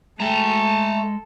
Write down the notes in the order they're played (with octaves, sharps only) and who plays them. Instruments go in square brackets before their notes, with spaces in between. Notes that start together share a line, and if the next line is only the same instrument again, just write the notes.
[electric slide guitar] G#3 G5 [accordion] A3 [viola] A4 [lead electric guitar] A5 A#5